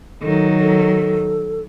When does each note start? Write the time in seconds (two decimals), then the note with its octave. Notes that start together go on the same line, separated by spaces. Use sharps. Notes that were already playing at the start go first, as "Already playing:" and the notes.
0.22 D#3 F#3 A4
0.60 A4